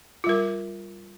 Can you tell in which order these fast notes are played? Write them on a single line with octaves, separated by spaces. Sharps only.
F4 G3 A#4